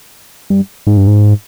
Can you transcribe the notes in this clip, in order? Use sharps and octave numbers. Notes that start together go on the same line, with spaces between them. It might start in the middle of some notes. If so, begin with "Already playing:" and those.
G2
G#2
G2
G#2